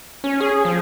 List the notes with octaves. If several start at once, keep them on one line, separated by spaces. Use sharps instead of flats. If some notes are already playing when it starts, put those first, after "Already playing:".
C#4
G#4
F3